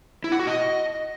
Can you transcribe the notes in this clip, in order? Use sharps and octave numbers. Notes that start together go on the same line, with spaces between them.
E4
F#5
F#4
D#5